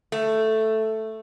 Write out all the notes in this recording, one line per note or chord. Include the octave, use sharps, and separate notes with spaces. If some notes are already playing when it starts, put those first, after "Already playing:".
A3